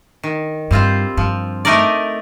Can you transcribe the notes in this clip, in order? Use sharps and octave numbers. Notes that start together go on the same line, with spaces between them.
D#3
G2 G3 C4 F4 C5
G2 F3
A3 D#4 A#4 D5